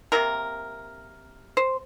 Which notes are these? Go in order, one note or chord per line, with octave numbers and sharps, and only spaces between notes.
C3 G3 A#3 A#4
C5